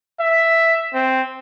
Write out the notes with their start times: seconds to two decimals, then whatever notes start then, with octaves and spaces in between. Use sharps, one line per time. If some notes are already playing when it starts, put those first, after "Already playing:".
0.20 E5
0.94 C4